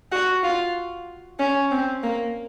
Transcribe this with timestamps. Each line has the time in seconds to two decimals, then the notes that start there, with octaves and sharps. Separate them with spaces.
0.12 F#4
0.44 F4
1.39 C#4
1.71 C4
2.04 A#3